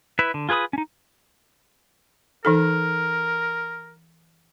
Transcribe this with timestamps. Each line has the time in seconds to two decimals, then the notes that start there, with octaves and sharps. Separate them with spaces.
0.19 E4 B4 E5
0.34 D3
0.49 F4 G#4 B4 B5 D#6
0.73 C#4 D#4
2.45 E3 D#4 A4 A#4